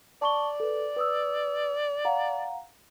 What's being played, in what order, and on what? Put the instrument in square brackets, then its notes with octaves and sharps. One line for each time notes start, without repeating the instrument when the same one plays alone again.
[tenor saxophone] D5 [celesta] A5 C#6 G7
[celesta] A4 B4
B4 D#6 E6
F5 F#5 A#5